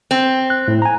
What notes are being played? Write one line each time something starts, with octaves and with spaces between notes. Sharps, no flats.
C4
F#6
A2
G#5 A#5